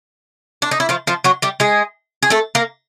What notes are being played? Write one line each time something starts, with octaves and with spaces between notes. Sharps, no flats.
D4
D#4
E4
F3 F4
F3 F4
F#3 F#4
G3 G4
G#3 G#4
G#4
A3 A4
A#3 A#4